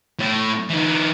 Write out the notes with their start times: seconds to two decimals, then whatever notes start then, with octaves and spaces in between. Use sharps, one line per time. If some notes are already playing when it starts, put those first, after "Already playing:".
0.19 A2
0.70 E3 D#4